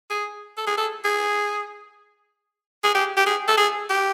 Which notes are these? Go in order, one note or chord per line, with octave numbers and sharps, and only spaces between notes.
G#4
A4
G#4
A4
G#4
G#4
G4
G4
G#4
A4
G#4
G4